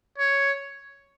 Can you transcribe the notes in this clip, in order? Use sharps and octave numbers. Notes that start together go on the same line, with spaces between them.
C#5